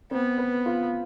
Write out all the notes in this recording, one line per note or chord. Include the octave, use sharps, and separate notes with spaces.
B3 C4
B4
F4